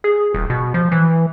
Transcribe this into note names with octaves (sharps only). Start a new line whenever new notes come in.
G#4
D#1
B2
F3
E3